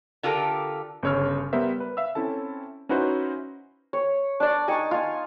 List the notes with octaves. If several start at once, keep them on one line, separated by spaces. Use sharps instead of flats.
D3 F4 G4 A4 A#4
G1 C#3 C#5 E6 F6
G3 B3 A#4 C5 E5
B4
E5 F5 E6
C4 C#4 E4 A4 A5
C#4 D#4 E4 F#4 B4 C5
C#5
D4 D5
D#4 G#5 A5 C#6
F4 G#5